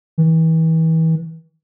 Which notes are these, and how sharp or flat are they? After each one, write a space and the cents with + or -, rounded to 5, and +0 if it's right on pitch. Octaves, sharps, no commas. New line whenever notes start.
E3 -35